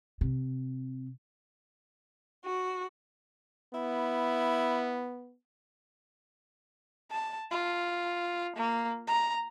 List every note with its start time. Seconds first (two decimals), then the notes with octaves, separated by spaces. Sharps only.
0.21 C3
2.43 F#4
3.74 B3 E4
7.11 A5
7.51 F4
8.56 A#3
9.07 A#5